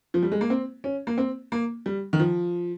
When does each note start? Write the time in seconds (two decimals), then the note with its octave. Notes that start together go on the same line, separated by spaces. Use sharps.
0.14 F3
0.23 G3
0.32 G#3
0.41 A#3
0.50 C4
0.84 C#4
1.07 A#3
1.18 C4
1.52 A#3
1.86 G3
2.13 D#3
2.20 F3